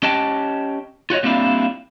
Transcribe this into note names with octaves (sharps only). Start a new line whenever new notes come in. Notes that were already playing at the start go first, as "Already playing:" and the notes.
C#4 G4 D#5 G5 A5
F4 F#4 C#5 D#5
G3 A#3 C4 D4 E4 F4